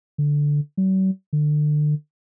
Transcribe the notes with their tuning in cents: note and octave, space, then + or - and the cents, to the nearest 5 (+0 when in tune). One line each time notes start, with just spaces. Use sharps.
D3 -5
F#3 +45
D3 +30